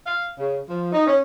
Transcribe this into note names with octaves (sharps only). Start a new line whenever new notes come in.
F5
C#3
F3
D#4
C#4